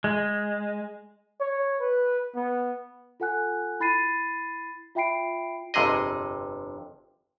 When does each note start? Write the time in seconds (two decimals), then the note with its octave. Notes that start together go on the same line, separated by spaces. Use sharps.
0.04 G#3
1.41 C#5
1.80 B4
2.36 B3
3.20 F4 A4 F#5 G#5 F#6
3.80 E4 B5 A6 C7 D#7
4.95 F4 E5 G5 B5 C7 D7
5.74 G1 F2 C3 G#4 D#5